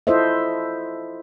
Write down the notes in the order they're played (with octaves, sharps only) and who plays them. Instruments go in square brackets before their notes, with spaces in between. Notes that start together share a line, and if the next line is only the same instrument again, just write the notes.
[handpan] E4 F4 A4 C5 D#5 E5